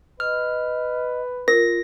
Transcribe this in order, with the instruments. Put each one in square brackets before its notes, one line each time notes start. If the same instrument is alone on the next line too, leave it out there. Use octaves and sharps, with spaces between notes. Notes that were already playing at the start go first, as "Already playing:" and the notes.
[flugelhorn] B4 [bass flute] D#5 [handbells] F6
[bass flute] F4 [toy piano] A#4 [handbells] A#6